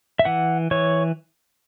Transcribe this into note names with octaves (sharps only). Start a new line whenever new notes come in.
E5
E3 F#5
E3 C#5